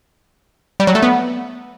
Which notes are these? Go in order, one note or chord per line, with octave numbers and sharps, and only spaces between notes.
G3
F#3
A3
B3